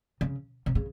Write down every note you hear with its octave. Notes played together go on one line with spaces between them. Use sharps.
C#3
C3
C#3